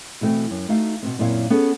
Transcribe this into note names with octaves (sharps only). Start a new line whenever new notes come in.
B2 E3 A3 C4
F#2
A3 D#4 F#4 F5
B2 B3 C4
F#2 A#2 C4 E4 C#5 F5
B3 C#4 G#4 A4